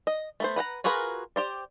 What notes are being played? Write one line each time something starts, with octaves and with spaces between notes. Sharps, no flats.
D#5
A3 B3 C5
B4 F#5 G5 A#5
F4 F#4 G#4 A#4 B4
G4 C5 D5